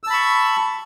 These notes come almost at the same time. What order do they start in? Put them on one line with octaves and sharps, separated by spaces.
E6 A5 B5 C#6